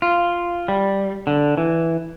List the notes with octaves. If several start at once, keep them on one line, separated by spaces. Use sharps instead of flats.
F4
G3
D3
E3